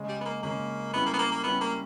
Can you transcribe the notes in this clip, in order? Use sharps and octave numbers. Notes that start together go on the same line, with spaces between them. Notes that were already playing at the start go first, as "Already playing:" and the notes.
Already playing: C#3 G#3 C#4
G3
B3
A#3
C#3 G#3 A#3 C#4
G3 B3 C#4 E4
A#3
B3
A#3
A#3
G3 B3 C#4 E4
A#3